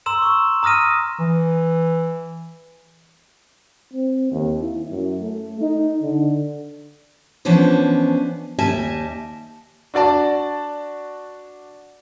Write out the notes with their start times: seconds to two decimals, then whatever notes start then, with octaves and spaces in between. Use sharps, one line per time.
0.06 A#5 C6 E6 E7
0.22 C#6
0.63 A#5 D#6 F6 A#6 D#7
1.19 E3
3.93 C4
4.31 D#2
4.61 E4
4.91 F#2
5.19 A3
5.61 D#4
6.03 D3
7.45 E3 F3 B3 C#4 D4 C5
8.59 D#2 G3 D#5 E5 G#5 A5
9.94 D4 F#4 D5 A5